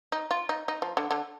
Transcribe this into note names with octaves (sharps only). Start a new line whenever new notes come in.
D#4
F4
D#4
D#4
F3
D3
D3